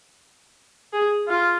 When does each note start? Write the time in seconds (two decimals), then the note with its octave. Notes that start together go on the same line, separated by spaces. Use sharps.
0.93 G#4
1.28 F4